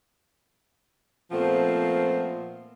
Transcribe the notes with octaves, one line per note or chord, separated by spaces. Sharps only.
A#2 F3 A3 B3 C4